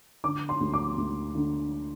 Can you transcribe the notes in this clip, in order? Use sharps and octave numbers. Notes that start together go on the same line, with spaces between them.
D3 D6
C6
D2
D6
D2
D3